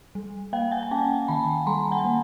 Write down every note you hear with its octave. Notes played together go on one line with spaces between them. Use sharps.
G3
A#3 F5 G5
F#5 G#5
G#5
C#4 G5 A5
D#3 A5 B5
G3 A#5 C6
F#5 G#5
A#3